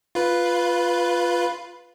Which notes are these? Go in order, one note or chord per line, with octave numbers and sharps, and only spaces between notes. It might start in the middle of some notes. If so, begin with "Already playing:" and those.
F4 B4